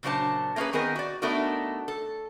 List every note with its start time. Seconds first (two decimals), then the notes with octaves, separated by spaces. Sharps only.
0.03 A#2 C#3 F#3 D4 C5 A5
0.56 A3 A#3 C#4 G4 G#4 B4
0.73 D#3 B3 C4 G#4 A#4 D#5
0.96 F#4 D5
1.22 A3 B3 D4 D#4 F#4 A#4
1.88 A4